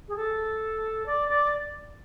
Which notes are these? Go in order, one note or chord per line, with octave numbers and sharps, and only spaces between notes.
G#4
A4
D5
D5